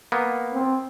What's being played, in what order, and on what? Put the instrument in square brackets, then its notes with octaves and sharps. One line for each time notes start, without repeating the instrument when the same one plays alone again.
[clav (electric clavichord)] A#3 B3
[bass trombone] C4